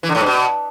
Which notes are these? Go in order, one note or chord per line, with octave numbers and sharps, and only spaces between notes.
E3
D3
A2
G2
B2